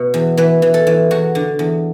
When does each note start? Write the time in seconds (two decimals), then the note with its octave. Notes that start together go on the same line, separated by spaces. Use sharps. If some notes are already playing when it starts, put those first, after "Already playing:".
Already playing: B2
0.14 E2
0.37 E3 B4
0.62 E3
0.74 A4
0.87 E3
1.11 E2 F#4
1.35 D3
1.59 E2